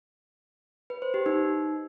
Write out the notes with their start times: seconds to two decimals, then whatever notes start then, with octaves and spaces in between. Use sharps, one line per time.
0.90 B4
1.02 C5
1.14 G4
1.26 D#4